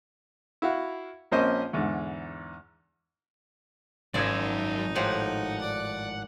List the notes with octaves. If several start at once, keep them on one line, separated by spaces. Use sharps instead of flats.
E4 F#4 F5 F#5
A#1 A#3 C4 C#4 C5 D#5
E2 G#2 D3
G#1 F#2 F3 D#4 D5 E6 G#6
A2 F3 G4 F#5
D5